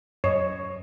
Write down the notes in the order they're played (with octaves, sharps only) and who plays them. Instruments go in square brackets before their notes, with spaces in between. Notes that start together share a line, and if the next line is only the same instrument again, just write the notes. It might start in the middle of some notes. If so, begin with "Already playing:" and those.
[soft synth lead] F#2 [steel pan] C#5 D#5